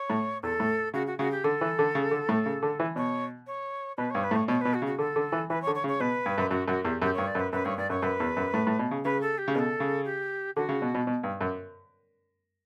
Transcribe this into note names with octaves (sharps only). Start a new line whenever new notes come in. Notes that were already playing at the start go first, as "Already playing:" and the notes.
Already playing: C#5
A2
E2 A4
A2
C#3 F#4
F#4
C#3 F#4
G4
D3 A4
E3
D3
C#3
D3
A2
C#3
D3
E3
B2 C#5
C#5
B2 B4
G2 C#5
B4
A2
C#5
B2 C#5
B2 B4
F#4
C#3
F#4
D3 A4
D3
E3
E3 B4
C#5
D3
C#5
C#3
C#5
B2 B4
G2
F#2
F#2 F#4
F#2 F#4
E2 G4
F#2 G4
G2 C#5
D5
F#2
B4
F#2 B4
G2 C#5
G2 D5
F#2 C#5
F#2 B4
E2
F#2
A2
A2
B2
C#3
C#3 B4
A4
G4
C#3
B2 B4
A4
C#3
G4
D3 F#4
C#3
B2
B2
B2
G2
F#2